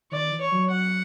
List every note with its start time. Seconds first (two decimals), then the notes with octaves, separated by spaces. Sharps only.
0.12 D#3 D5
0.31 E3
0.41 C#5
0.52 F#3
0.70 F#3 F#5